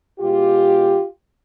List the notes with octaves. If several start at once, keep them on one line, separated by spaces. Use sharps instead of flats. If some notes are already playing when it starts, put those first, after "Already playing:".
B2 G#3 F4 G4